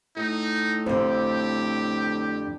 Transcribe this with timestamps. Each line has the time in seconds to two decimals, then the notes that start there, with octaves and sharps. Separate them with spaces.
0.16 A2 D#4
0.86 F2 D3 G4 C5